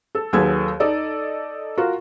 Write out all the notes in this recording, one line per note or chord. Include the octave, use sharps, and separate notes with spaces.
A4
D#2 F#3 G#4 A4 B4 G#6
D#4 A4 D5 D#5
F4 F#4 A#4